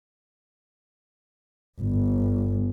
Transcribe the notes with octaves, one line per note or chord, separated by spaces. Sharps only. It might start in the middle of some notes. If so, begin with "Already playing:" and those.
G1